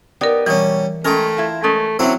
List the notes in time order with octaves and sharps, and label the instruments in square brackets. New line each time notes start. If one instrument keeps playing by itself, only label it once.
[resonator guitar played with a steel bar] B3 D#4 G4 [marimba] A#4 D5
[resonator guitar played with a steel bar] B2 F#3 [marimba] E3 [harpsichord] G3 C#4
[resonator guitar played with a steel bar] G#3 C#4 A#5 [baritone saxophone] A3 [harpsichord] A#4 G5
[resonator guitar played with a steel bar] E4 F4 A5
[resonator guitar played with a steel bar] G#3 C#4 A#4 [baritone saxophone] A3
[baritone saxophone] F#3 [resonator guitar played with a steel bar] A3 A#3 C#4 [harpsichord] C4 E4